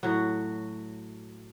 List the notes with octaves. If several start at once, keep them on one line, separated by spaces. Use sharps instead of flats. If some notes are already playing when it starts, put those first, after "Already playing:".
A2 F#3 F#4